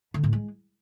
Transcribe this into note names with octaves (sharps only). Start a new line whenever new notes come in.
D3
A2
G#3